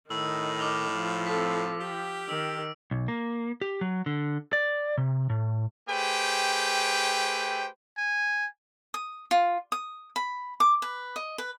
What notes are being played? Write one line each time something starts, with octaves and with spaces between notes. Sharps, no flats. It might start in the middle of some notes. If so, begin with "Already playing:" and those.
A2 D#3 D#4 E6
D6 F6 F7
F3
C4 A4 B6
G4 G5
D#3 E6 D7
B1
A#3
G4
F#3
D3
D5
C3
A2
A3 G4 G#4 B4 C5 G5
G#5
D#6
F4
D#6
B5
D6
B4
D#5
B4